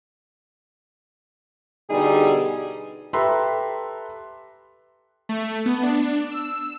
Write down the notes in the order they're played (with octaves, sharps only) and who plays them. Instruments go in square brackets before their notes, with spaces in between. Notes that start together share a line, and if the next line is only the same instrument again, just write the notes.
[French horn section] B2 D3 G3 D#4 G#4
[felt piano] G4 A4 B4 E5 A#5 C6
[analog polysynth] A3
B3
D4
E6